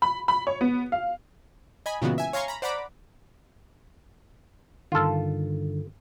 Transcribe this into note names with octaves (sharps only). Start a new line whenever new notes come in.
B5
B5
C#5
B3
F5
D#5 G#5 B5
A#2 C#3 E3 G#3 B3 F#4
E5 G#5
C#5 F5 G#5 A#5 C6 C#6
A#5 B5
C5 D5 F#5 A#5 B5 D6
G2 D3 D#3 F4 A4